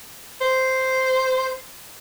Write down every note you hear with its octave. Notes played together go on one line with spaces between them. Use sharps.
C5